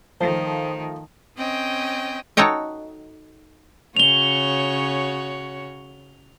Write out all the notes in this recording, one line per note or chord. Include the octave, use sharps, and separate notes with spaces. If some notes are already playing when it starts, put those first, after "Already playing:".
D#3 F3 A3 C5
C4 C#4 D#5 G5
D#4 F#4 A4 C#5 D#5 G5
C#3 F#4 C#5 F7 G7